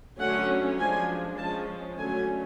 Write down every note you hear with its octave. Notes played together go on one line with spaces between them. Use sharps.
D3 F#3 A3 C#4 F#5
F3 G#3 D4 G#5
F3 G#3 C#4 A5
D3 F#3 A3 C#4 G#5